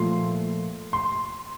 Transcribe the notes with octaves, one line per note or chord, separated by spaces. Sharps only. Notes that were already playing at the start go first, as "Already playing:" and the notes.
Already playing: A#2 F3 A3 C6
C6